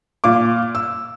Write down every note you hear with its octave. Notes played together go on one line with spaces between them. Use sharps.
A#2 F5 D6
E6